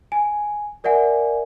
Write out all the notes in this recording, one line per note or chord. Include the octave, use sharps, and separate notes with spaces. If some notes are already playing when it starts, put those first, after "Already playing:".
G#5
A#4 D5 E5 F#5 G#5